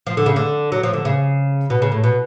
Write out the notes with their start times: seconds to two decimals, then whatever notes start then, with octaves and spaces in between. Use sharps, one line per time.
0.07 F3
0.17 D3
0.26 C#3
0.36 D3
0.72 F#3
0.83 F3
0.93 D3
1.05 C#3
1.70 B2
1.82 C#3
1.92 A2
2.04 B2